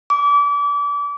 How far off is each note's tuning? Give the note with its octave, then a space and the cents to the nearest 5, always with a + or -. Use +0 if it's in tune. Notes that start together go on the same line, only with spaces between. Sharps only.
D6 -30